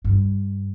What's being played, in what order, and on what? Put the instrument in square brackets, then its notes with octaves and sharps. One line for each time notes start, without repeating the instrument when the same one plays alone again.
[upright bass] G2